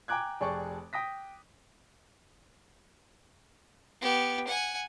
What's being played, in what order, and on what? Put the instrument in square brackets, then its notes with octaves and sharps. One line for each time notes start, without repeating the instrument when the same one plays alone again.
[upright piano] G5 G#5 A#5 D6 F#6 G#6
F1 G#4 D5 G5 A5 C#6
G5 D#6 A#6 B6
[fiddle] B3 G4
F#5 G#5